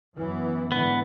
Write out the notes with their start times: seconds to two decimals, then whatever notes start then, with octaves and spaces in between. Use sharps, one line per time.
0.17 F#2 E3 B3
0.72 G#2 D3 E3 B3